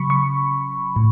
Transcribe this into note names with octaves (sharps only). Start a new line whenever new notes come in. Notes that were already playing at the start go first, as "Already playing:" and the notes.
Already playing: C#3 F#3 B5 C#6
C#6
A2